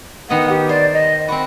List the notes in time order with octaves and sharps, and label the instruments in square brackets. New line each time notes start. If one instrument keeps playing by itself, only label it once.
[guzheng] D#3 B3 C6 [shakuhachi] F#5
[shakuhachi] G4
[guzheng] C5 [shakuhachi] D5
[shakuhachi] D#5
[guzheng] C4 F#4 [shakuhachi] B5